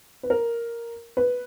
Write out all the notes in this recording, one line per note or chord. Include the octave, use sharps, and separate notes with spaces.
B4
A#4
B4